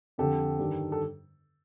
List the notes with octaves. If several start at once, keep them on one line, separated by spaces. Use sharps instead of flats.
F2 D3 F3 G4 A4
G2 D#3 G3
A4